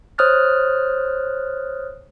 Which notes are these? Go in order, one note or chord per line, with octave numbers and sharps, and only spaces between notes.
C5 C#5 D#6 F6 F#6 A6